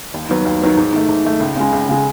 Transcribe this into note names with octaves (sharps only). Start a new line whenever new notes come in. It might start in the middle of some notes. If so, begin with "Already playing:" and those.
D#2
D#3 F#3 B3
D#2
D#3 F#3 B3
G#2
D#3 A3
G#2
D#3 A3
C#2
C#3 G#3
C#2
C#3 G#3